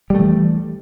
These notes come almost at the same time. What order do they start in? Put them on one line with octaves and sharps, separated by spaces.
G3 A3 E3